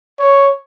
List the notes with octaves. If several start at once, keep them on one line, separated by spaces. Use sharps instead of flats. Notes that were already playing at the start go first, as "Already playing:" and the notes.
C#5